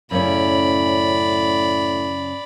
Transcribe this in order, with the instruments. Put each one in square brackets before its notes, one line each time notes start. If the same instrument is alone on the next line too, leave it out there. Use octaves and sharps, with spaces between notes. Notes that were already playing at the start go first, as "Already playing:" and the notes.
[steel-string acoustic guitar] F#2 C#3 C#4 [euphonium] A2 [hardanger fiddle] D5 B5